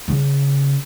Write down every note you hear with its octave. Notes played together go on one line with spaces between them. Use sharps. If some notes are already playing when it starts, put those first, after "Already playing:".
C#3